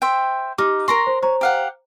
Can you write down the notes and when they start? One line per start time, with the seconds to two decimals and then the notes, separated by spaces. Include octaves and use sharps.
0.02 C5 E5 G5
0.58 D#4 G4 D6 F6
0.88 A#4 A#5 C6 C#6 A#6
1.07 C5
1.23 C5 C#5 A#5
1.41 G4 F5 F#5